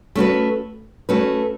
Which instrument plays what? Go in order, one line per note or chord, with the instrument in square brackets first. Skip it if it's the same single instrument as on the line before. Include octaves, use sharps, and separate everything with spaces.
[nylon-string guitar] A3 C#4 F#4 B4
A3 C#4 F#4 B4